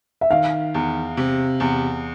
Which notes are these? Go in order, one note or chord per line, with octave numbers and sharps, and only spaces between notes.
E5
D#3 F5
E2
C3
E2